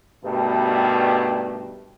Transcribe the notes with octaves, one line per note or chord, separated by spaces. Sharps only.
G2 B2 D#3 G3 A3